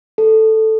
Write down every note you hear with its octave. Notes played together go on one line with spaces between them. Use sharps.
A4